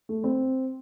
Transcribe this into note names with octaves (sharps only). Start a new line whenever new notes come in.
A3
C4